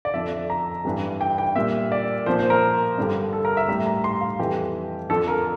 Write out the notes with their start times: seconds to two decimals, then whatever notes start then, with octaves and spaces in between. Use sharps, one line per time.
0.05 D5
0.14 F2 D3 F3 E5
0.50 A#5
0.85 G2 E3 G3
1.21 G5
1.38 G5
1.56 A#2 G3 E5
1.92 D5
2.26 A#2 F3 C5
2.39 C5
2.50 A#4
2.98 G2 D3 G3
3.33 A4
3.45 A#4
3.57 E5
3.68 G3 E5
3.72 A2
3.86 A#5
4.04 C6
4.21 F5
4.39 F2 E3 G3 G4
5.09 F2 D3 F3 A4
5.28 A#4